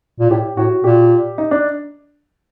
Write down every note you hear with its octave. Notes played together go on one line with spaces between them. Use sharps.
A#2
A2 G4
A2 F#4
A#2 G4
D#4
D4